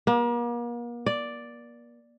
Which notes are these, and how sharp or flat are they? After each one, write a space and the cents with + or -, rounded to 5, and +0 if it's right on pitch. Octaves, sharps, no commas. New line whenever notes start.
A#3 +40
D5 +0